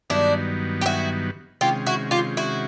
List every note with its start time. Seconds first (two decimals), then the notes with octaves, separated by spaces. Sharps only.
0.10 G2 D#3 F#3 B3 D4 E4
0.81 G4
0.86 E4 F#4
1.61 C3 D#3 G#3 C#4 F4 G4
1.86 E4 F#4
2.11 F4 G4
2.37 E4 F#4